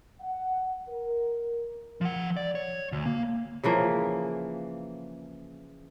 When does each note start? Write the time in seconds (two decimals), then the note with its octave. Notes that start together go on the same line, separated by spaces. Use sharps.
0.21 F#5
0.88 A#4
2.01 F3 F#5
2.36 D5
2.55 C#5
2.92 D2
3.06 A#3
3.64 C#3 E3 F3 A#3